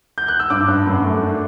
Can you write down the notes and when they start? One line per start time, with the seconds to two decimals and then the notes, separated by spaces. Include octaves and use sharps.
0.18 G6
0.28 F#6
0.40 E6
0.50 G2 D6
0.68 G2
0.87 F#2
1.04 A3
1.23 D4